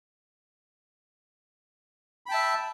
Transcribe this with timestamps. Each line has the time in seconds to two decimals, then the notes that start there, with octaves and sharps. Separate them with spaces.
2.26 B5
2.29 G5
2.31 A5
2.34 E5